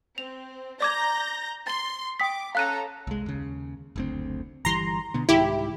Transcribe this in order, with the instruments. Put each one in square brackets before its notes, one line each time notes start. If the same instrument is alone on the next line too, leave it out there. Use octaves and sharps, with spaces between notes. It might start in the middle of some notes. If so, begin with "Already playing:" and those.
[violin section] C4 [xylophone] F7
[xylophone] D5 D6 G#6 [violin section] A#5 G6 A#6
[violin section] C6 [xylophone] A6 G7
[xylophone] G5 D#6 B6 [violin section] D6
[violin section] C#4 A4 A#5 [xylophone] F5 F#6 D#7
[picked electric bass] C2 G#3
D#2 C#3
F#1 D2 C4
[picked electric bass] G1 E3 G3 [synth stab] A#5 C6
[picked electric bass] B2 D3 B3
[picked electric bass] C2 G#2 D#3 [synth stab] E4 G4